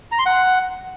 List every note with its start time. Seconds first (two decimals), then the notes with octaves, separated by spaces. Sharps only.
0.12 A#5
0.19 C6
0.26 F#5